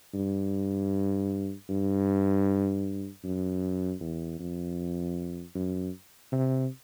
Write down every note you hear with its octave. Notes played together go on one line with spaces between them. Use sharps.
G2
G2
F#2
E2
F2
F#2
C3